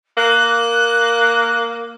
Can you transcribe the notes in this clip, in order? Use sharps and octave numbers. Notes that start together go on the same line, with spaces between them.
A#3 F#6